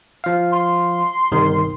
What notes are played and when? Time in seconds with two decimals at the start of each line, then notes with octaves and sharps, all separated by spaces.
0.24 F3 F5
0.53 C6
1.32 G1 C2 D#3